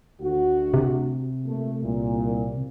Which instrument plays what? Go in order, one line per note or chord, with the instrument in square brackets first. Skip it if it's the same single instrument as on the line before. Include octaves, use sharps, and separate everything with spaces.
[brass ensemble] D2 F#4
[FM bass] C3
[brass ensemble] A#2 A3
C2 A#2